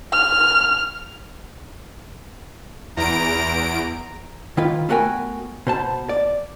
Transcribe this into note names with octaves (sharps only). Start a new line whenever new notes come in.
F6
E2 A#5 D7
D#3 E4 F4 B4
A3 B3 F#4 A#4 G5 G#5
B2 C5 A5
D5